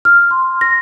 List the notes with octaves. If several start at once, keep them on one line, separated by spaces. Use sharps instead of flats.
F6
C6
A#6